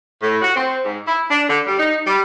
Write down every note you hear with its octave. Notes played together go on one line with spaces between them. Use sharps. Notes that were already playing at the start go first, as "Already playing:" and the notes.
A2
F#4
C4
G#2
E4
D4
D3
G3
D#4
G3